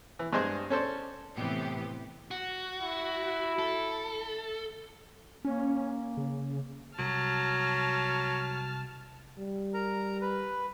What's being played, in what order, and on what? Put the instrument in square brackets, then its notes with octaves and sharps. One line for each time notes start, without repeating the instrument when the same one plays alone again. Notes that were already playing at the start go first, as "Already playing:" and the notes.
[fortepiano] E3
G2 G#3 D4 G#4 C5 D#5
C#4 A4 C5 D5
[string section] A2 C3 E3 B3 G4
[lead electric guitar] F#4
[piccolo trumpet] E4
[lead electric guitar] A4
[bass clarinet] A#3 [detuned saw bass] C#4
[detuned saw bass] C#3
[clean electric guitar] C2 [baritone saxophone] F#3 [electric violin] A5 F6
[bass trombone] G3
[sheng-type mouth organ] A#4 A#5
B4